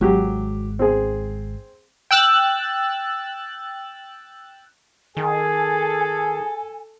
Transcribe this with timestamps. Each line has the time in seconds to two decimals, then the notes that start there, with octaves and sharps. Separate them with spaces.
0.01 G#1 F#3 G#3 G4
0.79 C4 G#4
2.11 G5 E6 F#6 A6
5.17 D#3 G#4 A4 G#5